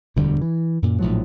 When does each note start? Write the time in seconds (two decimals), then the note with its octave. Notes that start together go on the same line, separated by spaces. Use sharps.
0.16 E1 D2 D3 G3
0.41 E3
0.82 F#2 A#2
0.99 A#1 A2 F3 F#3